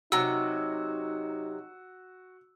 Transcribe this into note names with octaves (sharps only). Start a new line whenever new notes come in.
C3 F#3 D#4 F#4 A#5 E6